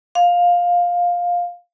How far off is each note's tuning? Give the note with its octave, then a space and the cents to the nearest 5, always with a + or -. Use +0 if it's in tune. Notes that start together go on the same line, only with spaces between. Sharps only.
F5 +10